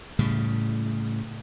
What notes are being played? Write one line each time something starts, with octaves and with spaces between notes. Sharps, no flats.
A2 C#3 G3